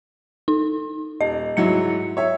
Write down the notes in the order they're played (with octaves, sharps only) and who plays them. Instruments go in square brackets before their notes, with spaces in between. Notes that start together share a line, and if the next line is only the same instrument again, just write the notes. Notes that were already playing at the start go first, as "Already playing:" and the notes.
[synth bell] D#4
[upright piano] D#1 [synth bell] D#5
[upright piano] G#2 F#3 E4 [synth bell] C#7
[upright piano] C#5 E5